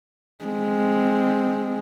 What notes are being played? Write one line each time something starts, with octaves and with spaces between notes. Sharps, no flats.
G#3 C4